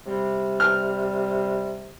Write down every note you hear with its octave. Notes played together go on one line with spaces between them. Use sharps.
C3 G3
F6